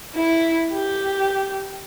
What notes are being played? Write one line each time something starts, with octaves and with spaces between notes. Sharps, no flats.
E4
G4